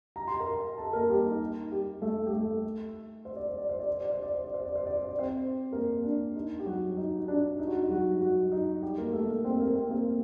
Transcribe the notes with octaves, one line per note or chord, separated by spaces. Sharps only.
A#5
C6
A#4 A#5
A4 A5
A#3 A#4
G3 G4
D#4
G3 G4
A3 A4
G4
A3 A4
C5
D5
C5
D5
C5
D5
C5
D5
C5
D5
C5
D5
C5
D5
C5
D5
C5
D5
C4 C5
A#3 A#4
D4
D#4
G4
F#3 F#4
D#4
D#4
D4
D#4
F#4
D#4
F#3 F#4
F#3 F#4
D#4
G3 G4
A#3 A#4
A3 A4
A#3 A#4
C4 C5
A#3 A#4
C4 C5
A#3 A#4